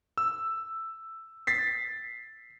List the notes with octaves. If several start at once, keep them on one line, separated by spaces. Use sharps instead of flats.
E6
A6 B6 C7